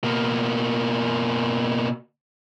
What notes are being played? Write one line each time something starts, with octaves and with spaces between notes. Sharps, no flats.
B2 A#3